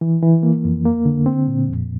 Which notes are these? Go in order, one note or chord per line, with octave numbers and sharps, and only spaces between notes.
E3
E3
A#3
F2
A#3
D3
C4
A#2
F2